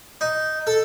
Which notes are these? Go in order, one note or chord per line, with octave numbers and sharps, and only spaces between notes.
D#4
A4